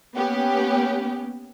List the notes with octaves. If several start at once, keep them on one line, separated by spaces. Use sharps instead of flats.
A#3 B3 C#4 G4